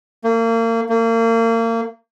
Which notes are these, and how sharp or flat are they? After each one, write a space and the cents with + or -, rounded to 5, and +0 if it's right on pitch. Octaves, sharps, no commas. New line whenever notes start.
A#3 -35
A#3 -35